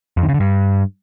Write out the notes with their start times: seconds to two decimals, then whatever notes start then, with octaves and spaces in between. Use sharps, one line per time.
0.17 F2
0.23 D#3
0.29 C#3
0.34 D3
0.40 G2